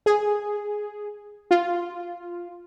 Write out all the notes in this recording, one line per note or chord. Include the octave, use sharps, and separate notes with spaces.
G#4
F4